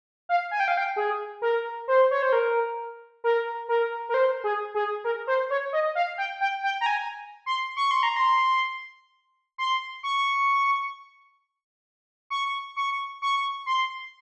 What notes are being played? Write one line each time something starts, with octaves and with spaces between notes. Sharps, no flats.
F5
G#5
G5
F5
G5
G#4
A#4
C5
C#5
C5
A#4
A#4
A#4
A#4
C5
G#4
G#4
A#4
C5
C#5
D#5
F5
G5
G5
G5
A#5
G#5
C6
C#6
C6
A#5
C6
C6
C#6
C#6
C#6
C#6
C6